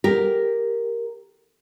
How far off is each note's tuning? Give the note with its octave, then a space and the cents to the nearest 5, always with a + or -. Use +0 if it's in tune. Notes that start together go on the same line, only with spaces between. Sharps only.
G4 +10 A#4 +0